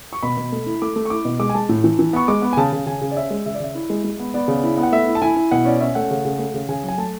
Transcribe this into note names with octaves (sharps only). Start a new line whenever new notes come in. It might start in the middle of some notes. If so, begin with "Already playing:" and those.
C#6
B2 B5
B2
A3
E4
A3 D6
A3
C#6
E4 D6
B2
G#3 D6
G#5
G#3 A5
A2
E3
E3
B3 C#6
G#3 D6
B3
G#5
C#3 A5
C#3
C#3 G#5
C#3
D5
C#4 E5
G#3
C#3 E5
D5
C#3 E5
E4
G#3
G#3
B3
B3 D5
C#3
E4
B3
F#5
A3 E5
E4
A5
E4 G#5
E4
B2 F#5
C#4 D5
C#4 E5
A3 F#5
C#3
C#3
A3
C#3
C#3 G#5
F#3 G#5
A3 A5